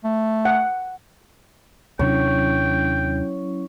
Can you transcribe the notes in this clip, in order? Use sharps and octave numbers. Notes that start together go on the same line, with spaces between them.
A3
F#5
D#2 C3 F#3 C#4 D4 E4 C#5 G5